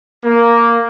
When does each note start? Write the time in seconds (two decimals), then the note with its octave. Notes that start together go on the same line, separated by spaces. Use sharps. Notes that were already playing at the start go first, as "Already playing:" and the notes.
0.24 A#3